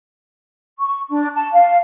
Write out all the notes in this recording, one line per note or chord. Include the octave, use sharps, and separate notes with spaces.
C#6
D4
A5
F5